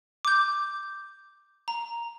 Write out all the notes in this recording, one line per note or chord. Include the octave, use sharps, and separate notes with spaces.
D6 G6
A#5